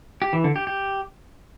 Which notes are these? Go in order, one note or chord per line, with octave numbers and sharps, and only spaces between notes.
G4
E3
D3
G4
G4